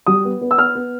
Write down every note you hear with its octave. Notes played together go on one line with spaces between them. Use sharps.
G3 D#6
B3
B3
E6
B3 F6
B3